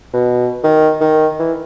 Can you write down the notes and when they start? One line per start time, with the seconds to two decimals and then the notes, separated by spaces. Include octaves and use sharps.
0.13 B2
0.64 D#3
1.01 D#3
1.39 E3